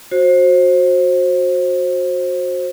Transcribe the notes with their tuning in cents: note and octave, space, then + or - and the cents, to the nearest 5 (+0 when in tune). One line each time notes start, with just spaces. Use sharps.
F#4 -15 C5 +20